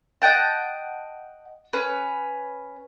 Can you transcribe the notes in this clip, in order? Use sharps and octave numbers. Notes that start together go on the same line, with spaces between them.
D#5 F#5 G5 A5
C#4 B4